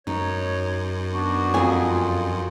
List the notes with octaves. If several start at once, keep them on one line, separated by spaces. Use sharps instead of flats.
F#2 D#4 C#5
B3 D4 F#4
F2 G#4 G#5
F4